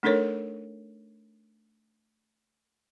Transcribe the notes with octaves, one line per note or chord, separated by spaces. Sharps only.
A3 D4 D#4 A4 A#4 C#5